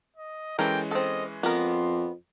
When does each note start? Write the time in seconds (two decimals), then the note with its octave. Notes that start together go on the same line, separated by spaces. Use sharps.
0.16 D#5
0.59 E3 G#3 C#4 A4 A#4 G5
0.91 C4 A4 D#5
1.43 F2 B3 A#4 C6